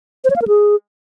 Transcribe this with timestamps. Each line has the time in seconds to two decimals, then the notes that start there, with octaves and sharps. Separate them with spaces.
0.25 C5
0.30 C#5
0.36 F5
0.42 A#4
0.48 G#4